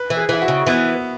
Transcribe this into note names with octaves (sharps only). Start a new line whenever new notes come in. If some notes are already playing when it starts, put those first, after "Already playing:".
Already playing: B4
E3
G#4
E3 E4
F#4
C#3
E3 B3